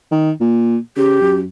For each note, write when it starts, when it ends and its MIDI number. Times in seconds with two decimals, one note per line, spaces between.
0.12 0.31 51
0.40 0.77 46
0.97 1.19 49
0.97 1.35 67
1.21 1.44 42